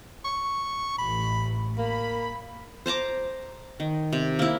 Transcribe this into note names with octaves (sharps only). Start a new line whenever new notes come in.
C#6
A1 B5
A#3 B5
C5 A5 A#5 D6
D#3
C3
A#3 E4